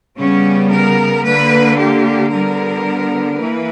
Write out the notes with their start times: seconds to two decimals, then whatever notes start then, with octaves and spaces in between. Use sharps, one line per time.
0.17 C#3 G3 B3 C#4
0.71 A#4
1.24 D3 A#3 B4
1.78 G4
2.32 D3 G3 B3 A#4
3.39 E3 A#3 B4